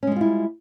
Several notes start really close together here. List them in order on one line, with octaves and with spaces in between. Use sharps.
C#4 G#3 G3 F4 E4